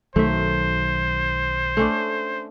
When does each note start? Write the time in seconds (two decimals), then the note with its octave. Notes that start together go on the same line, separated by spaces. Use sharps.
0.16 B1 D#3 F#3 A3 C5 E5
1.77 A3 C#4 D4